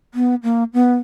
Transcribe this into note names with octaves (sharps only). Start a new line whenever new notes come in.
B3
A#3
B3